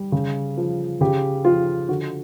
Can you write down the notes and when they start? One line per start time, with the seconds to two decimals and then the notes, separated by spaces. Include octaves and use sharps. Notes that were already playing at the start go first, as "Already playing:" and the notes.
Already playing: G3
0.12 C#3
0.57 F3
1.01 C#3 G4
1.45 F3 F4
1.89 D3 F#4